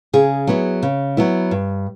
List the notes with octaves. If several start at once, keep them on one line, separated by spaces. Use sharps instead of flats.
C#3 G#4
F#3 B3 E4
C#3
F#3 B3 E4
G2